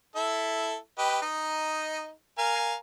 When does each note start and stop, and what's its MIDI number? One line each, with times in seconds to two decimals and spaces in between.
0.16 0.76 64
0.16 0.76 69
0.16 0.76 76
0.98 1.20 67
0.98 1.20 71
0.98 1.20 75
1.22 2.10 63
1.22 2.10 75
2.38 2.74 70
2.38 2.74 77
2.38 2.74 80